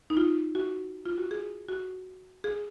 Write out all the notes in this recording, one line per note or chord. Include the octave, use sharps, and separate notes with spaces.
D#4
F4
F#4
F4
F#4
G#4
F#4
G#4